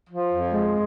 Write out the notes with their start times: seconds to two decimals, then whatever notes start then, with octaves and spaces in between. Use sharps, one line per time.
0.08 F3
0.31 F2
0.53 G#3